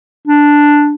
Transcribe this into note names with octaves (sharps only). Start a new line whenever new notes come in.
D4